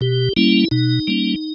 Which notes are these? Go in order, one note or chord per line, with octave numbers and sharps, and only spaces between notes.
B2 G4
G3 A#3 C#4 E4
B2 D#4
G3 A#3 C#4